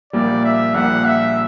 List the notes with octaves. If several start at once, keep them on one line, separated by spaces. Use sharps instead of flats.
A#1 A#2 G3 A#3 D5
E5
A#1 A#2 G3 A#3 F#5
E5